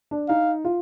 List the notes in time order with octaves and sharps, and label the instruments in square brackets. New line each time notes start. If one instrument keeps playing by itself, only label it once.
[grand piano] D4
[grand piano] D#4 [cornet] F5
[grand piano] F4